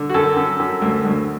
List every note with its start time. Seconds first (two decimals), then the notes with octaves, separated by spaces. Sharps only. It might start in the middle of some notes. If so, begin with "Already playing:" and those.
Already playing: D3
0.10 F#4
0.14 F#2 A4
0.37 F#2
0.60 F#2
0.82 D2
1.05 D2